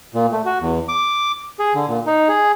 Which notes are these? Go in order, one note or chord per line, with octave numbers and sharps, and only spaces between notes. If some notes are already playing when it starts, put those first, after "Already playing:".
A#2
A3
F#4
E2
D6
G#4
D3
A#2
D#4
G#4